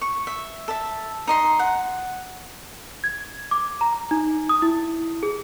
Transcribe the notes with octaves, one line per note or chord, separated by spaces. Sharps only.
C#6
E5
A4 E5
D#4 D#5 C6
F#5
G#6
D6
A#5
D#4
D#6
E4
G#4